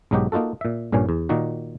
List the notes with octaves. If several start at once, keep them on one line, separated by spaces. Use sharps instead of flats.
B1 G#2 F#3 D#4 F#4 G4
A#3 D#4 F4 F#4 A4
A#2 E5
A#1 G2 A#2 C#4 G#5
E2
A#2 D#3 A#3 D#4 F#4